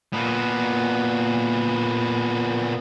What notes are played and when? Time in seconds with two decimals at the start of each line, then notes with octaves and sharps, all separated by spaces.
0.13 A#2 B3